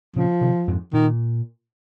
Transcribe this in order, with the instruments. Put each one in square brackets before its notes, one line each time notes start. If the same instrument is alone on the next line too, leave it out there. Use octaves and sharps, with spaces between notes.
[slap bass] A#2 C#3 [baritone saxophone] F3
[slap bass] C3 D#3
F2 G#2
[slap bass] A#2 [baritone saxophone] D#3